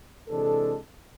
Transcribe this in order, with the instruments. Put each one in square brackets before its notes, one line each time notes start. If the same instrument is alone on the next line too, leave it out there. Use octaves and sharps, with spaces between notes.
[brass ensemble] C3 E3 G#3 D4 A4